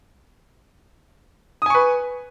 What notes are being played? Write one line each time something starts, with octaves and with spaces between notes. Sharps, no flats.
B4 G#5 C#6 D#6